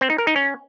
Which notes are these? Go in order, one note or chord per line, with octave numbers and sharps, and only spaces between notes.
C4
D#4
A#4
D#4
C#4